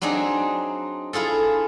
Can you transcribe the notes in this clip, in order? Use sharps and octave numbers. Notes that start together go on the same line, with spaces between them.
F#3 C4 D4 D#4 G#4
E4 F4 G#4 A4